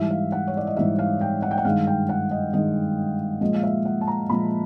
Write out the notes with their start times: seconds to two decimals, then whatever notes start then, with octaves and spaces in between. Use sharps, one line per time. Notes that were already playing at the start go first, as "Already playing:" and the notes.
Already playing: G#2 E3 G3 E5
0.10 F5
0.32 F#5
0.47 C#5
0.57 D5
0.67 D#5
0.77 G#2 E3 G3 E5
0.99 F5
1.21 G5
1.42 F#5
1.51 G5
1.58 F#5
1.65 G2 D#3 G#3 F5
1.87 G5
2.09 F#5
2.31 D#5
2.53 G2 D#3 G#3 D#5
3.41 A#2 F3 G#3 D#5
3.54 F5
3.63 E5
3.85 F#5
4.01 A5
4.07 A#5
4.29 A#2 F3 G#3 B5